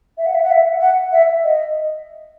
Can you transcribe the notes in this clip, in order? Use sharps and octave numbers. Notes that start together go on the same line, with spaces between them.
E5
F#5
E5
F#5
E5
F#5
E5
D#5